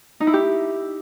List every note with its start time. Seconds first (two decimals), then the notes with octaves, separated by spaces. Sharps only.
0.20 D#4
0.27 E4
0.33 G4